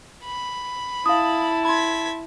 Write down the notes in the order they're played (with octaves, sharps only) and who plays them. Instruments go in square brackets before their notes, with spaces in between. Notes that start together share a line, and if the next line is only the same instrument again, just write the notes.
[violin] B5
[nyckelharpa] E4 A5 [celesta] F5 D#6
[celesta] B5 C6 [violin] G#6 B6